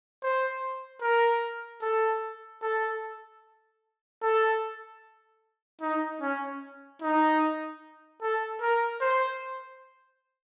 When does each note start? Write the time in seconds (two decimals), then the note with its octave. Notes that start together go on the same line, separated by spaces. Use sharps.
0.23 C5
1.02 A#4
1.82 A4
2.62 A4
4.22 A4
5.82 D#4
6.21 C#4
7.02 D#4
8.22 A4
8.62 A#4
9.01 C5